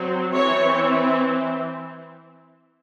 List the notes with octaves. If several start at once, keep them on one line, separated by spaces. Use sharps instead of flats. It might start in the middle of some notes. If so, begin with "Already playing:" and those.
Already playing: F#3 C4
E3 C4 C#5